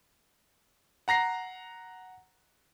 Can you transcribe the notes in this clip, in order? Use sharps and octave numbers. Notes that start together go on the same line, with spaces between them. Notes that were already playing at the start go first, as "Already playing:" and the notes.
F#5 A#5 A#6 C7